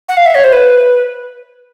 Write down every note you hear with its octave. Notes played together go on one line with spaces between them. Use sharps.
F#5
F5
E5
C#5
C5
B4